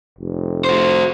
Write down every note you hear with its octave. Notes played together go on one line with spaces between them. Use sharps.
F1
F#4 C5